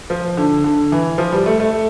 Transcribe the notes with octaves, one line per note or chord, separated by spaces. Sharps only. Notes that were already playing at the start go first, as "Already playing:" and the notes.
F3
D3
D3
E3
F3
G3
A3
A3